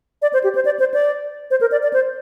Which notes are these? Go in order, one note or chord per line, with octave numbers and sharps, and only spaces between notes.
D5
C5
G4
C5
D5
C5
D5
C5
A#4
D5
D5
C5